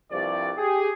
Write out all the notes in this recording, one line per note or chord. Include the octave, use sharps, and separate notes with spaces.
C2 G2 F3 G4 D5
G4 G#4